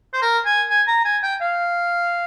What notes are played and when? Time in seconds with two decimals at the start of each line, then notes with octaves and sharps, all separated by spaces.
0.13 C5
0.22 A#4
0.46 G#5
0.70 G#5
0.87 A#5
1.05 G#5
1.23 G5
1.41 F5